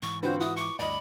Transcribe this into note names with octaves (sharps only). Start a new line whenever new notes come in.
G#2 E3 C#6
D3 C4 F4 F#4 B4 C5
E4 F#4 D#6
C#6 D6 C#7
D2 G2 D5 D#5 B5